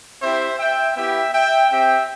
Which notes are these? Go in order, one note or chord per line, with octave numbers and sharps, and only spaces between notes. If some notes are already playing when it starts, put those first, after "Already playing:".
C4 E4 G4 C5 E5
E5 G5
B3 E4 G4 E5 G5
E5 G5
C4 G4 E5 G5